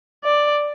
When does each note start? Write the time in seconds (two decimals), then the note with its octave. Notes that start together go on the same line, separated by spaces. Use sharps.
0.24 D5